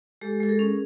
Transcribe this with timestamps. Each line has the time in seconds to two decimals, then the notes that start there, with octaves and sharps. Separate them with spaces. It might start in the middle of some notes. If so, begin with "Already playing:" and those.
0.21 G#3 G4 A4
0.40 G#3 A4
0.49 G#4 A#4
0.59 C#4